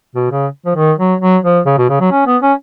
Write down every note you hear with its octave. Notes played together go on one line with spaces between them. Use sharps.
B2
C#3
F3
D#3
F#3
F#3
F3
C#3
B2
C#3
F#3
C#4
B3
C#4